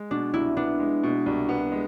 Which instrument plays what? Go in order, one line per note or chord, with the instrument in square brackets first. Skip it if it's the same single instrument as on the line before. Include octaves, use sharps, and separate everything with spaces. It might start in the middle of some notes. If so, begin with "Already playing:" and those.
Already playing: [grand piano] G#3
[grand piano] B2 [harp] D4
[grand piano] C2 [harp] E4
[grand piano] B3 [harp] D4
[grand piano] G#3
B2
C2
B3
G#3